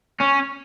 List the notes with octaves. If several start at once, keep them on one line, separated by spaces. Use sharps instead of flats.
C#4